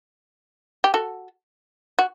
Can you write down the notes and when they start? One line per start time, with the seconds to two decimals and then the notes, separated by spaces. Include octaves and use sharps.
0.84 G4
0.94 F#4 A4
1.99 F#4